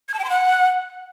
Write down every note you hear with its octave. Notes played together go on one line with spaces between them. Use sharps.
G#6
A5
G5
C6
F#5